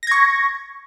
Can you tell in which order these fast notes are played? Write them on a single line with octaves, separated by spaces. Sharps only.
A#6 G#6 C#6